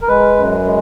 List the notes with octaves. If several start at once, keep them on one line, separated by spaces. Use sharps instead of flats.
A#4
G#3 B4
F#2
G#3